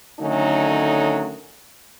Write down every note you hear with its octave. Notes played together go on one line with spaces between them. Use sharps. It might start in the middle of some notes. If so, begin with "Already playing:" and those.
D3 D#3 F#3 A3 C#4 D#4